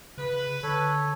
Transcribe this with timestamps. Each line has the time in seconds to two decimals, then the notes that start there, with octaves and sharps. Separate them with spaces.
0.18 C#3 B4
0.63 D3 A4 C#5